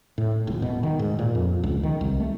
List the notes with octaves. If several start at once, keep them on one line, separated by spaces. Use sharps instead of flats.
A2
D#1
B2
D#3
G#2
A#2
F2
C#2
D#3
C2
A3